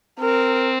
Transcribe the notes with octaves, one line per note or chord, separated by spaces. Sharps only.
C4 A#4